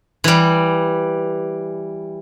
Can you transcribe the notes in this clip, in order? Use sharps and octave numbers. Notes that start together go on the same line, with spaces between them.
E3 G3